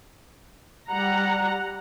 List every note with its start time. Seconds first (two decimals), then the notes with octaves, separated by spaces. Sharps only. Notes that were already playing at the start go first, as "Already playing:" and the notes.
0.89 G3 F#5 A#5